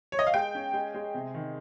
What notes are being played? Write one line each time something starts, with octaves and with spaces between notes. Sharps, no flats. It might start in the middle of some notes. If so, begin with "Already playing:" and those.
C#5
D#5
F5
G#3 G5
C#4
G#3
G#3
C3
D#3